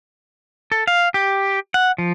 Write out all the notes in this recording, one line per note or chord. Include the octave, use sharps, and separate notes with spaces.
A4
F5
G4
F#5
F3